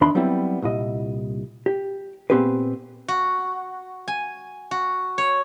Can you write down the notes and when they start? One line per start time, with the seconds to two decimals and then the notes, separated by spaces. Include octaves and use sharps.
0.01 E2 D#3 D4 E5 B5 C6
0.15 F#3 G3 B3 C4 E4
0.62 C2 A#2 E4 D#5
1.66 G4
2.30 A#2 B3 C4 G4 G#4 B4
3.08 F#4
4.08 G#5
4.71 F#4
5.18 C#5